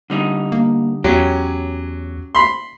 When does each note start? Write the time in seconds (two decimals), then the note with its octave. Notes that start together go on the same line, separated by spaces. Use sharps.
0.10 D3 G3 D#4
0.52 A#3
1.04 E2 F#3 C#4 G4
2.35 B5 C6